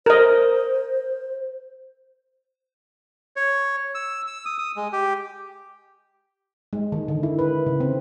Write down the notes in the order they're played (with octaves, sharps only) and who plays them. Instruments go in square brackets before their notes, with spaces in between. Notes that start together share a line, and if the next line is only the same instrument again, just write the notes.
[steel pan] A#4 D#5 [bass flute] C5
[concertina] C#5
E6
E6
D#6
D#6
G#3
G4
[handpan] G#3
D#3
D3
E4
B4
C#3
C4